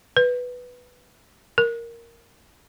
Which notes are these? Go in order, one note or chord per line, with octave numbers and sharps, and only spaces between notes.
B4
A#4